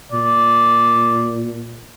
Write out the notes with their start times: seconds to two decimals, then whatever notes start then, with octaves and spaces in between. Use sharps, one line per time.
0.12 A#2 D5